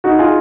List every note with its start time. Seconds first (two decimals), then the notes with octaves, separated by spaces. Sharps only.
0.04 D#4 F#4
0.19 F4 G#4